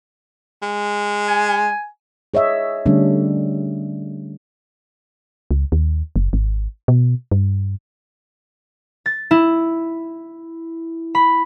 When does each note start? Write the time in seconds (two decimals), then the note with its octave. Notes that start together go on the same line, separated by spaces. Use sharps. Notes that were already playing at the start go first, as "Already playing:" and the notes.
0.62 G#3
1.28 G#5
2.34 G#4 C#5 D#5 E5
2.86 D3 G3 A3 C#4 D4
5.51 C#2
5.72 D#2
6.16 F#1
6.33 G#1
6.88 B2
7.32 G2
9.06 A6
9.31 E4
11.15 B5